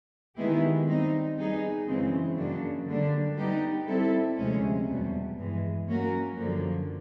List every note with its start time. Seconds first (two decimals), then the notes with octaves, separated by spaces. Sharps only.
0.36 D#3 G#3 B3 E4 G4
0.86 G3 C4 D#4
1.37 G3 B3 D#4 G#4
1.87 F#2 C#3 E3 G#3 C4
2.37 F#2 C#3 F#3 A#3 D4
2.86 D3 G3 A#3 D4
3.37 G3 B3 D#4 G4
3.87 G3 C4 E4 A4
4.37 D2 C3 F3 G#3 C#4
4.88 E2 B2 G3
5.37 G2 E3 G#3
5.87 F#3 A#3 C#4 F#4 A#4
6.37 F#2 D3 F3 A#3